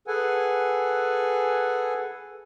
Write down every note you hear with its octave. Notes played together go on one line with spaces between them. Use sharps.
G#4 A4 B4 F#5 G#5